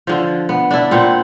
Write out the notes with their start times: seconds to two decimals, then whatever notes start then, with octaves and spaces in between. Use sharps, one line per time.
0.07 D3 F3
0.49 B3
0.71 D4 E4
0.91 A#2 C4 F#5